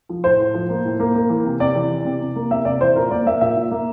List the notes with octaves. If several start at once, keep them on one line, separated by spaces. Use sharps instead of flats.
F3
A2 C5
A2
F3
A#3
A2
A#3
A#3
E3
C3
C3 D5
E3
E3
C3
C3
A#3
C3 E5
C3 D5
E3 C5
A#2 A#4
A#3 D5
A#3 E5
A#2 E5
A#2
A#3